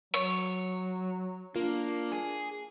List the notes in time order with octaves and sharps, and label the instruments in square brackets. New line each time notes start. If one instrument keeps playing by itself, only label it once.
[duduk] F#3 [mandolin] C#5
[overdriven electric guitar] A#3 [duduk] D4 [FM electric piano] F4
[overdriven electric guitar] G#4